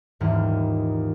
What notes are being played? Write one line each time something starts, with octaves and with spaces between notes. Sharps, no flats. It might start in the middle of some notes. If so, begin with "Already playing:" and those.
D#1 D#2 G#2 E3 F6